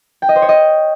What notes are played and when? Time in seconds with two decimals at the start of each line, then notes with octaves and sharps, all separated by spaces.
0.22 G5
0.29 D#5
0.35 C5
0.42 C#5
0.49 D#5